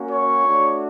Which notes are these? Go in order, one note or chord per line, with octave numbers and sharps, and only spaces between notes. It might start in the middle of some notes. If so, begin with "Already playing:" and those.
Already playing: A#3 C#4 F#4
C#5
A3 D4 F#4